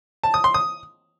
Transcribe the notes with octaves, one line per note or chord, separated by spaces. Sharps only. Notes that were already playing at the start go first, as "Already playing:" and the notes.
A5
D#6
C6
D#6